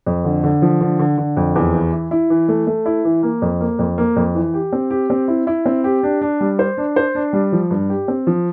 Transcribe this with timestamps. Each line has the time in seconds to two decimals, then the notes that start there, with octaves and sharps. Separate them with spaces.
0.06 F2
0.25 D3
0.44 D3
0.62 F3
0.81 D3
0.99 D3
1.18 D3
1.37 F2
1.56 E2
1.74 E3
1.93 E4
2.11 E4
2.30 E3
2.48 A3
2.67 A3
2.86 E4
3.05 E3
3.23 A#3
3.42 F2
3.60 A#3
3.79 F2
3.98 A#3
4.16 F2
4.35 E3
4.54 G4
4.73 C4
4.91 G4
5.10 C4
5.28 E4
5.47 E4
5.66 C4
5.84 G4
6.03 D4
6.21 D4
6.41 G3
6.59 C5
6.78 D4
6.96 C5
7.15 D4
7.33 G3
7.52 F3
7.71 G2
7.90 G4
8.08 C4
8.27 F3